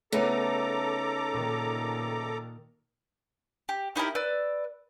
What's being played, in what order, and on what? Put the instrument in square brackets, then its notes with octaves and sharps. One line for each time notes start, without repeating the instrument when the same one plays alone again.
[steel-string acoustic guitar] C#3 D#4 [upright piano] A3 B3 [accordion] A4 A#5 D6
[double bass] A#2 D#3
[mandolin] G4
D#4 E4 G4 A#4
B4 D5 E6